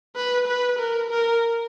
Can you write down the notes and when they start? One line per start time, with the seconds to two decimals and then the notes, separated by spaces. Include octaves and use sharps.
0.16 B4
0.47 B4
0.79 A#4
1.10 A#4